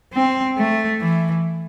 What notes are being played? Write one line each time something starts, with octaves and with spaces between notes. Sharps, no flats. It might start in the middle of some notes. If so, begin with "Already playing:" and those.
C4
A3
E3